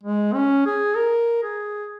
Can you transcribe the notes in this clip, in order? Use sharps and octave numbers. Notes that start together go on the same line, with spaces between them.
G#3
C#4
G#4
A#4
G#4